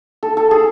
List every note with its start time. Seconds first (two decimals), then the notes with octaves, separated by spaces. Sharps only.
0.23 A4
0.37 A4
0.51 G#4